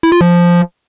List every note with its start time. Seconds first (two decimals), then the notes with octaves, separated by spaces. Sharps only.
0.03 E4
0.12 F4
0.21 F3